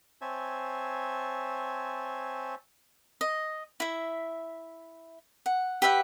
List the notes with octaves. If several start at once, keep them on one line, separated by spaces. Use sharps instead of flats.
C4 C5 C#5 E5 G#5 A5
D#5
E4 E5
F#5
G4 B4 E5 F#5